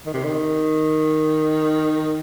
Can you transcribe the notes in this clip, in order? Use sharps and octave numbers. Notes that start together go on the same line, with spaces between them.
D#3
C3
D#3